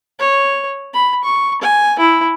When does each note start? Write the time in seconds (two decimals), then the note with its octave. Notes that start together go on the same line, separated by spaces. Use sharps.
0.19 C#5
0.94 B5
1.24 C#6
1.61 G#5
1.99 E4